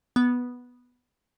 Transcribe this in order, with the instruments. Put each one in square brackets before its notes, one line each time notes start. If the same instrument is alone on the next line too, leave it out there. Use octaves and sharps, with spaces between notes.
[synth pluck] B3